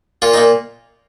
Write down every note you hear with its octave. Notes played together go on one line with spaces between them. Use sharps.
A#2 F4
D#4
A#2